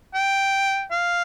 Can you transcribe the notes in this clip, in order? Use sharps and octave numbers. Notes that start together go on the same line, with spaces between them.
G5
F5